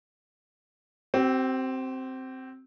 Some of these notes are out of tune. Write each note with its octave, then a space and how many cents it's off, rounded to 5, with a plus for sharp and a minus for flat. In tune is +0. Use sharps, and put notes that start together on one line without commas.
C4 +0 G4 -45